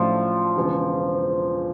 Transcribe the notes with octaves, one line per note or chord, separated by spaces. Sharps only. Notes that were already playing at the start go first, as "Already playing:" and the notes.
Already playing: A1 A2 F3 F#3 A3 D4
E1 E2 C#3